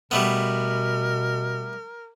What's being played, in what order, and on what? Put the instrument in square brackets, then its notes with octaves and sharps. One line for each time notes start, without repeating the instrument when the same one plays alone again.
[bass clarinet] B2 [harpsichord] G3 A3 B3 [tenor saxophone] A#4